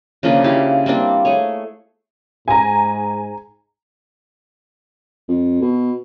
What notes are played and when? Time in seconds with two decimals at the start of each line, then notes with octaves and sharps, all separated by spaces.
0.23 C#3 F3 A#3 D4
0.44 E4 F4 G4 F5
0.86 G3 A#3 C4 D4
1.25 A3 G#4 C#5
2.48 G#2 G#5 A#5
5.29 F2
5.62 B2